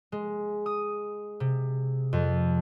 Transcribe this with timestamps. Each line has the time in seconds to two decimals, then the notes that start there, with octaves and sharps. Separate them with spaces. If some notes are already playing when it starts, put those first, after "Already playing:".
0.12 G#3
0.66 D#6
1.40 C3
2.13 F2